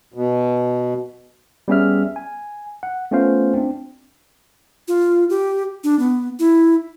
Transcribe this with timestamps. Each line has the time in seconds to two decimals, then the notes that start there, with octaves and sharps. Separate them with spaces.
0.14 B2
1.68 G3 B3 C#4 G#4 E5 F6
2.16 G#5
2.83 F#5
3.11 A3 B3 C#4 F4 C5 F5
3.54 C4 D4
4.88 F4
5.30 G4
5.84 D4
5.99 B3
6.39 E4